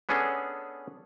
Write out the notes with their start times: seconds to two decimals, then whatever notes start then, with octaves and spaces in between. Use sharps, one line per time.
0.09 B3 C#4 D4 G#4 A4